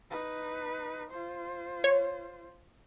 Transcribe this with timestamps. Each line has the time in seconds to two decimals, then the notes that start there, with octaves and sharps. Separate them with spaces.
0.11 D#4 B4
1.10 F4 C5
1.84 C#5